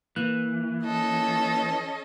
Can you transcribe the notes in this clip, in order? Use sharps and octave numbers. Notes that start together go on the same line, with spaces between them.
E3 A#3 F#6
C#4 A4 D#5